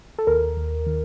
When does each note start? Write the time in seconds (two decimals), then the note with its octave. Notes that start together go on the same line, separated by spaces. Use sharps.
0.18 A4
0.27 D#2 A#4
0.57 D#2
0.86 D#3